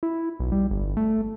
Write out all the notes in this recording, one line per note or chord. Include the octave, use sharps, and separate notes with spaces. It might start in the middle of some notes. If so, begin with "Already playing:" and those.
E4
B1
G3
G1
A3